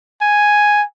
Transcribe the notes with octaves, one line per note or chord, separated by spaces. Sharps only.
G#5